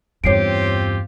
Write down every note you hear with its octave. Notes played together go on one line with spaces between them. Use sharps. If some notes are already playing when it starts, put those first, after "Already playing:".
E2 G2 C4 F4 G4 C#5 C7 D7